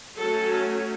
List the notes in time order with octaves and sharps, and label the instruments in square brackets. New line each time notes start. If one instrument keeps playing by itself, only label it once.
[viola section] F#3 A3 C#4 A4